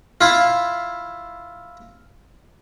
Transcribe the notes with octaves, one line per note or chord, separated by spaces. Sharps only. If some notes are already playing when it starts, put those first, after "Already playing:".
E4 F4